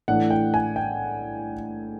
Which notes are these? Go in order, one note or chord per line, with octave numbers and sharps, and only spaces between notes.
A2 E3 A3 D4 F#5
G5
G#5
G5